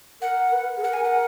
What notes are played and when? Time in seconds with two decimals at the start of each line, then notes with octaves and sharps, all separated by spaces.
0.21 A#4 F#5
0.52 B4
0.77 G#4
0.83 A#4 F#5
0.93 G#5
1.04 F#5